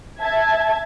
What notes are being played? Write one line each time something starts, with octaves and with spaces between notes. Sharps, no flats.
E5 A5 G#6